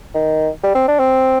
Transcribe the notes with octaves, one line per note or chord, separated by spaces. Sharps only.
D#3
G3
C4
D4
C4